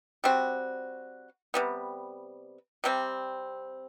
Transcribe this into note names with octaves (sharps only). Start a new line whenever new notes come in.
G3 C4 F#4
C3 G3 B3
C3 G3 C4